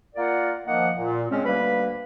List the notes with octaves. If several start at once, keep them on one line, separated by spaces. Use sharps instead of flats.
A#3 F4 A#4 D5 F#5
D#3 F3 A#3 F#5
A#2
C#3 G#3 C4 C#4
D2 G3 A#3 B4 B5